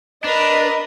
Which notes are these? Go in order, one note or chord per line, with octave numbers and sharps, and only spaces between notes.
D4 A#4 B4 D#5